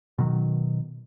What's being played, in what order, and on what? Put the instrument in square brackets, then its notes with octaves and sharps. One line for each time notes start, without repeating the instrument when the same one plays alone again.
[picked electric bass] B2 D#3 F#3